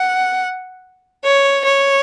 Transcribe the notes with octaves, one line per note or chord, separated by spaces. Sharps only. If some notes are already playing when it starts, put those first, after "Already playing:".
Already playing: F#5
C#5
C#5